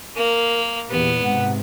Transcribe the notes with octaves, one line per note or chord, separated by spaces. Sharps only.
A#3 A#4
E2 A#2 B3 G4
G#2 C3 F#5